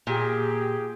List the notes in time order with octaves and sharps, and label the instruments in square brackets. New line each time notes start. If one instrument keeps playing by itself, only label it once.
[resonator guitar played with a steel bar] A#2 [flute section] G4 G#4